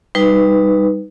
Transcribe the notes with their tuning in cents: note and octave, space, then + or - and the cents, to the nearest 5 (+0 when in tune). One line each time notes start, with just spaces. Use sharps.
G3 +10 D#4 +0 B4 +0